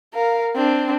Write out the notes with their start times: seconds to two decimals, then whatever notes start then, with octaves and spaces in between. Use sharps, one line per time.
0.14 A#4 F5
0.55 C4 D4